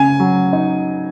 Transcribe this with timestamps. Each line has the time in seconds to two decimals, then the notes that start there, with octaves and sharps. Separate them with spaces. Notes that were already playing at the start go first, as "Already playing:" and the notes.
Already playing: C#3 G#5
0.20 F#3
0.53 D#4